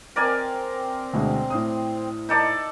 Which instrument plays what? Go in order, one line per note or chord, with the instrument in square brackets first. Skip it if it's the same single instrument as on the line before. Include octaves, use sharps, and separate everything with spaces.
[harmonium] C4 [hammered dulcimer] A#4 D5 G#5
[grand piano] D2 B2 G#3
A2 C5 D#6
[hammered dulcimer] D#4 A4 D5